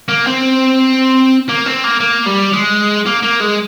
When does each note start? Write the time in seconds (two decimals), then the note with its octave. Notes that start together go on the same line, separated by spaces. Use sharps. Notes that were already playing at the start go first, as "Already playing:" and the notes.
0.09 A#3
0.27 C4
1.49 A#3
1.66 C4
1.84 A#3
2.00 A#3
2.26 G3
2.53 G#3
3.06 A#3
3.23 A#3
3.40 G#3